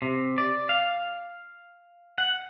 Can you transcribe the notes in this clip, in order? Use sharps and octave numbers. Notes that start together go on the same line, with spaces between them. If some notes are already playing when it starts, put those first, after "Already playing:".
C3
D5
F5
F#5